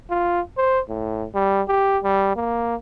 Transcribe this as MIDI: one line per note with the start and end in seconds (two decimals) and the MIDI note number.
0.10 0.41 65
0.57 0.80 72
0.89 1.27 45
1.35 1.62 55
1.68 1.98 67
2.04 2.32 55
2.36 2.75 58